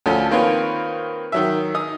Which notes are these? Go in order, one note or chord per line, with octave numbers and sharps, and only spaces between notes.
D2 F3 C#4 F4 A4
D#3 A#3 C4 F4 B4 C#5
D#3 F#3 E5
D#4 D#6